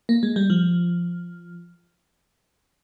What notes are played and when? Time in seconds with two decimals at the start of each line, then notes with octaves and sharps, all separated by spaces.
0.09 A#3
0.23 G#3
0.36 G3
0.50 F3